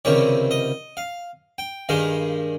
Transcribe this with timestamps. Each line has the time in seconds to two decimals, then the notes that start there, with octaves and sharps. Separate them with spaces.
0.05 C#2 C3 D#3 G3 C#5
0.51 D#5
0.97 F5
1.58 G5
1.89 G2 D#3 G#3 F5